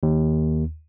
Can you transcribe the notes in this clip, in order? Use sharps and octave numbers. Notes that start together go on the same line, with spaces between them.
D#2